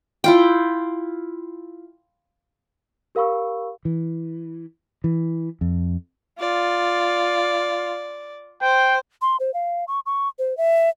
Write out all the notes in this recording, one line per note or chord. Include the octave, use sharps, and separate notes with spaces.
E4 F4 G5
G4 A#4 F5 B5 C#6 E6
E3
E3
F2
F4 D5
C5 G5
C6
C5
F5
C#6
C#6
C5
E5